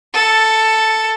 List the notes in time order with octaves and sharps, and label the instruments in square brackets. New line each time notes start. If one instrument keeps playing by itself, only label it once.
[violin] A4 C#7